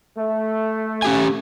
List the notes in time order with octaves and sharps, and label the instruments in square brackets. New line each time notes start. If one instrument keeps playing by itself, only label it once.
[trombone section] A3
[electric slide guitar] C#4 G4 G#5